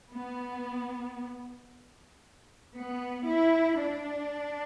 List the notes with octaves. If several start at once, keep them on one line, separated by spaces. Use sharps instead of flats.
B3
B3
E4
D4